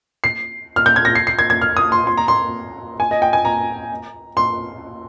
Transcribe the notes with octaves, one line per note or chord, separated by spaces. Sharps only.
C7
F6
G6
G#6
A#6
C7
C7
G#6
G#6
F6
D#6
C6
C6
A#5
C6
G#5
D#5
G5
G#5
A#5
C6